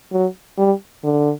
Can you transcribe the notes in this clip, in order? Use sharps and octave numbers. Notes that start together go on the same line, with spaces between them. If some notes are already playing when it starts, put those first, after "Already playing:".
F#3
G3
D3